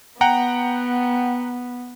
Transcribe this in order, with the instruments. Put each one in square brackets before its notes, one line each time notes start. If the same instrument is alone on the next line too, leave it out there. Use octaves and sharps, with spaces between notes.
[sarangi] B3 [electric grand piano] F#5 G5 A#5